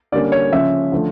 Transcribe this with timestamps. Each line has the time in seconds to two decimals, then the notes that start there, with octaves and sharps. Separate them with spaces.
0.12 D3 G3 A#3 C#4 D5
0.32 C#5
0.52 C#3 F3 C#4 E5
0.92 D3 F3 A3